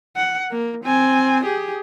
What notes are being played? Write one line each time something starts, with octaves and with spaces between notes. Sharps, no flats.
F#5
A#3
C4 G#5
G4 G#4